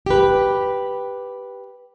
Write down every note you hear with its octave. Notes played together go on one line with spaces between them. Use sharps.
G4 B4